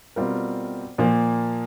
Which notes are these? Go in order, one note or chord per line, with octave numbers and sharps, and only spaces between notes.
B2 G3 C4 F4 A#4
A#2 F3 A#3